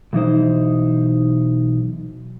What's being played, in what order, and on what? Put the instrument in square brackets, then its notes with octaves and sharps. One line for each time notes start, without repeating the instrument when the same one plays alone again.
[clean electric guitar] B1 E3 D#4 C5